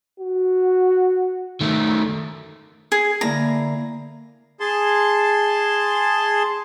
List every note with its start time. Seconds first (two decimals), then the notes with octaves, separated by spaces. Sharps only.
0.20 F#4
1.61 D#3 A3
2.92 G#4
3.21 D3 A#3 E4 A#5
4.60 G#4 A5 C6